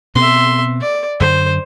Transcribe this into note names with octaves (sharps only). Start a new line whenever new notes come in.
B2 B3 C4 E5 C6
D5
F#2 D3 C5